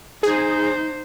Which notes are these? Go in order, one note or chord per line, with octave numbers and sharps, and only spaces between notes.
D#4 G#4 C5